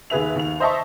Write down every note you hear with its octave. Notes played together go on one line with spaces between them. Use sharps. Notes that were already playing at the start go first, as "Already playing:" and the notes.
D#2 G#4 B4 E5 F7
D#2 F7
C5 D#5 E5 A5 C#6